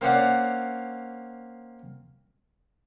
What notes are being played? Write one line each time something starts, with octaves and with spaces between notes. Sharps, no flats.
A#3 C4 C#4 C#5 D5 F#5